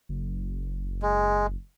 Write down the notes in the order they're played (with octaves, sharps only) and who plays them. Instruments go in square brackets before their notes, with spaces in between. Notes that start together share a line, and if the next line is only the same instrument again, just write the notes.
[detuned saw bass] F#1
[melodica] G#3